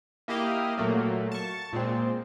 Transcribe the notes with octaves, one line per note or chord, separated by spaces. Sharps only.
A#3 E4 G4 D#5 F5
A#2 F#3 A3 A#3
A5 C#6
A#2 G#3 C4